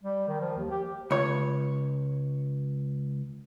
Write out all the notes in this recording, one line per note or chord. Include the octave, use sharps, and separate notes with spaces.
G3
D#3
F3
D#2
G4
C#2 C#5